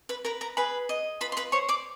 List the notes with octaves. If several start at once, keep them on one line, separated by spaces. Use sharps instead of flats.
B4 B5
A#4 B4 A#5
A#4 A#5
G#4 B4 B5
D#5
F4 B4 B5
C6
B4 B5
C5 C#5 C#6
D5 D6